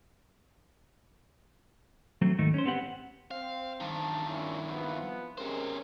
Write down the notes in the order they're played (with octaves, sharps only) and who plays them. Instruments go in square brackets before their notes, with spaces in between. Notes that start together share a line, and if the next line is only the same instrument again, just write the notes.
[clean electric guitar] F#3 A3 C4
D#2 G#2 D#3 A3 D#4
C#4 C5
B3 C4 G4 F#5
[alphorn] C4 [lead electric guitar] F5
[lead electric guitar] G2 D#3 [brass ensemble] A5
[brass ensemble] A#2 C#4 [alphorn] E4
[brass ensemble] C3 F3 B3
[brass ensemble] C3 G#3 [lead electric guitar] C#4 C5 [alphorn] A#4